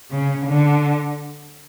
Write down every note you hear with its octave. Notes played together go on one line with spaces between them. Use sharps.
C#3
D3